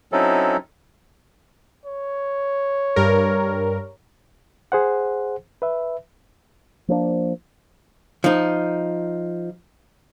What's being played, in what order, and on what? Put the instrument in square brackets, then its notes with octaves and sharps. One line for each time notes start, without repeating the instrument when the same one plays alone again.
[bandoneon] F#3 C4 C#4 D#4 E4 A4
[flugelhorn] C#5
[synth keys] G2 G3 A#4
[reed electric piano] G#4 C5 F#5
B4 E5
[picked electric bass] F3 A#3 D4
[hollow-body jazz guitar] F3 D#4